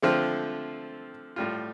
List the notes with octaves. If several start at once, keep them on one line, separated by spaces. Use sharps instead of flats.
D3 F3 A3 C4 F4
A2 G3 F4